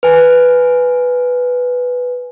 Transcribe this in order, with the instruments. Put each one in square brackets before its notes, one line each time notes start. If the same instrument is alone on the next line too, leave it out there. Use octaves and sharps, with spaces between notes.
[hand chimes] B4 G#5